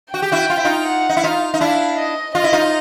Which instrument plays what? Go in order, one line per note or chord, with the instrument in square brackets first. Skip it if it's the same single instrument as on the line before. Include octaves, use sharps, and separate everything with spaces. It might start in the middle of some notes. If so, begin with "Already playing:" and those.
[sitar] F#4 [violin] G5
[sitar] G4
E4 F#4
F4
E4
D#4 F4
[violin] F#5
[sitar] D#4
E4
[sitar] D#4 F4 [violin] F5
[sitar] D#4
[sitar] D4 E4 [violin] F5
[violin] D#5
[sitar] F4 [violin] D#5
[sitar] E4
D#4 F4